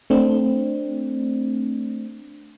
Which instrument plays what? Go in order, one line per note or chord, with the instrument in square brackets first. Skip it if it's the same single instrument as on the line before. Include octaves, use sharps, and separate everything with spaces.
[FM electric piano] A3 C4 D4